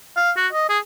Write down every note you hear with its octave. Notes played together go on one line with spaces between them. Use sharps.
F5
F#4
D#5
G#4